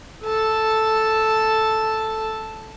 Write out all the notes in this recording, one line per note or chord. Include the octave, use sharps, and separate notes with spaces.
A4 A5